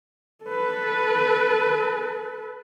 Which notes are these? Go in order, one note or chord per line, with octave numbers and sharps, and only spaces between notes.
A4 B4